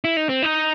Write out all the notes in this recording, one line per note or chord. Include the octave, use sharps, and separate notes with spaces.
E4
D#4
C4
D#4